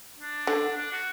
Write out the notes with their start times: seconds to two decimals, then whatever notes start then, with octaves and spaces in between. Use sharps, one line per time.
0.19 D4
0.47 D3
0.76 D4
0.92 F#4